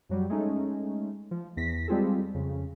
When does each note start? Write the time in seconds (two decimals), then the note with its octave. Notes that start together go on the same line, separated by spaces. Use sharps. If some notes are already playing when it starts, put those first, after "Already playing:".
0.09 F#2 F#3 G3
0.30 G#3 A3 C#4 D#4
1.31 F3
1.57 E2 A#6 B6
1.88 G3 G#3 C4 F4 G#4 A4
2.34 F2 C#3